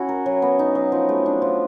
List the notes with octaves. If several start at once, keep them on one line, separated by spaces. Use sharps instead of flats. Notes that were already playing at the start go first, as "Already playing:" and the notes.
Already playing: C#4 E4 F#4
A#4
F#3
B3
D#4
F#3
F3
A3
D4
F3